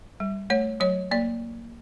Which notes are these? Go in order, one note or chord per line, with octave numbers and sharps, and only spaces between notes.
G3
A3 C#5
F#3 C#5
A#3 D5